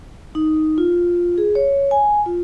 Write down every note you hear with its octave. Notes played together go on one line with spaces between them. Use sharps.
D#4
F4
G#4
C#5
G#5
F4